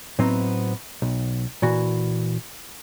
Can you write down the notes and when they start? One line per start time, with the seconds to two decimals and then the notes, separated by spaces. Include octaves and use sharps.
0.19 A2 F#3 B3 C4 D#4
1.02 B1
1.62 A#2 E3 F#4